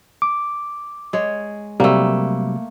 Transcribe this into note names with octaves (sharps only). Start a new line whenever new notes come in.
D6
G#3 C#5
C3 F#3 G3 A3 A#3